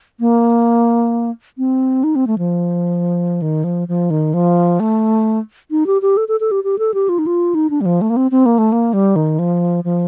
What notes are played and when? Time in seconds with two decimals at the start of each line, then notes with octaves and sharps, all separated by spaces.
0.20 A#3
1.58 C4
2.04 D#4
2.16 C4
2.27 A3
2.38 F3
3.42 D#3
3.64 F3
3.88 F3
4.10 D#3
4.34 F3
4.80 A3
5.71 D#4
5.87 G4
6.02 G4
6.17 A4
6.28 A4
6.40 A4
6.51 G4
6.64 G4
6.79 A4
6.94 G4
7.09 F4
7.19 D#4
7.27 F4
7.55 D#4
7.70 D4
7.81 G3
7.86 F3
8.01 A3
8.10 A#3
8.17 C4
8.31 C4
8.46 A#3
8.58 A3
8.72 A#3
8.93 G3
9.16 D#3
9.39 F3
9.84 F3